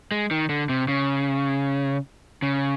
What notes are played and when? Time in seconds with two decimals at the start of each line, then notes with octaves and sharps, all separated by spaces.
0.11 G#3
0.31 D#3
0.49 D3
0.69 C3
0.88 C#3
2.42 C#3